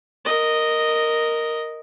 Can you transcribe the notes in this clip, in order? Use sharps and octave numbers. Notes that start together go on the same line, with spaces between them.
A#4 D#5